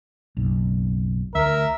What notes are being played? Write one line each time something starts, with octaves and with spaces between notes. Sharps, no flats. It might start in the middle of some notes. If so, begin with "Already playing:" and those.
F#1 B1
D2 A#4 E5